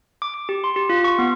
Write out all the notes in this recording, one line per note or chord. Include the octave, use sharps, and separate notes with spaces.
D6
D6
G4
C6
G4
F4
C#6
B3